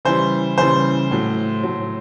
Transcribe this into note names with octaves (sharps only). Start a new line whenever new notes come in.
C#3 E3 G3 C5
C#3 E3 G3 C5
A2 F#3
A2 F#3